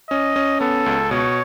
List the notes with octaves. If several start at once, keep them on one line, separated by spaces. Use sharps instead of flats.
C#4 D#5
C#4
B3 A4
C#2
B2 C#5